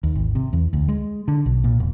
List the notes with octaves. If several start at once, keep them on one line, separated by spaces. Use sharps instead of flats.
D#2
G#1
C3
E2
D2
G#3
D3
B1
A#2
E1